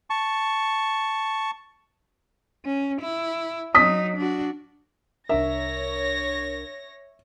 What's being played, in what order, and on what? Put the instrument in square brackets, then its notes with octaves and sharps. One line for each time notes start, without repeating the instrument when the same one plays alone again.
[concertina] A5 C#6
[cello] C#4
E4
[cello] F#3 D#4 [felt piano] D#6 B6
[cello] D4 F#4
[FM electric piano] C2 D4 A#4 [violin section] C#5 A#6 [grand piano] E5